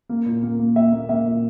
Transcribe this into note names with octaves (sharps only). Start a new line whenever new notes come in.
A#3
A#2
A#3
A#3
A#3 E5
A#3
A#3 E5
A#2